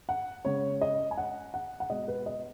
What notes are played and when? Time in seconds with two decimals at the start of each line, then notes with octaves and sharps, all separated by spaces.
0.09 F#5
0.45 C#3 G#3 C#5
0.81 D#5
1.11 G#5
1.18 F#5
1.54 F#5
1.80 F#5
1.89 B2 G#3 D#5
2.08 B4
2.26 D#5